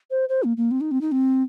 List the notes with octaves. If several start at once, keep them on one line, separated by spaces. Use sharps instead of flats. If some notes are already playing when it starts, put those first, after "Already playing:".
C5
C5
A#3
A#3
C4
D#4
C4
D#4
C4